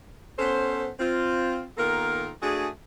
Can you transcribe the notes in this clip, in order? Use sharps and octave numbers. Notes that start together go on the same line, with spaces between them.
B3 C#4 A4 C5
C4 F4
D#3 A#3 B3 F4 A4 A#4
A3 D4 F#4 G#4